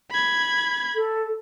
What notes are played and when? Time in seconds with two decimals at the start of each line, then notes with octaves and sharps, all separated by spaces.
0.11 B5 G#6
0.95 A4